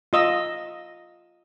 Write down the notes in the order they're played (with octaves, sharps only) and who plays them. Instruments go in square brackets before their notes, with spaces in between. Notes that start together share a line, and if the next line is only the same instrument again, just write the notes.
[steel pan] F4 D#5 E6